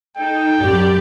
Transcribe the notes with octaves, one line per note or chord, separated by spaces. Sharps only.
D#4 A4 G5
F#2 G4 D5